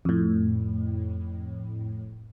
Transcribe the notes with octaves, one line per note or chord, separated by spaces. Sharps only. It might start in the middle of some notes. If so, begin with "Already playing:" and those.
F2 A2